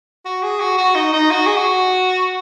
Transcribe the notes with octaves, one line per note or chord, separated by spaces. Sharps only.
F#4
G#4
F#4
F#4
D#4
D#4
F#4
G#4
F#4